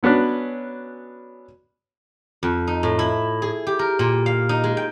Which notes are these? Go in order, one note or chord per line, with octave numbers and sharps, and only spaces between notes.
F#3 B3 C#4 D4 B4
F2
D#4
A2
E4
G#4
G4
A#4
A#2
F5
D#4
G#3
G5